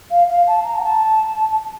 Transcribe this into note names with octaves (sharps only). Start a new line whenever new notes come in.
F5
F5
A5
A#5
F#5
A5